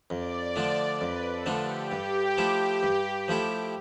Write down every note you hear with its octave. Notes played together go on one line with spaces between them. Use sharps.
F2 D5
D3 F3 A3 D4
F2 B4
A4
D3 F3 A3 D4
G4
G2
F3 A3 E4 A4
G2
F3 A3 E4 A4